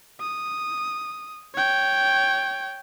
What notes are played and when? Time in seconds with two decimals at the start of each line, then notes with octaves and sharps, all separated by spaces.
0.21 D#6
1.55 C#5 G5